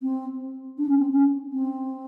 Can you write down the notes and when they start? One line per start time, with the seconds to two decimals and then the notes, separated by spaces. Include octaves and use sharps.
0.02 C4
0.78 D4
0.89 C#4
0.99 C4
1.11 C#4
1.52 C4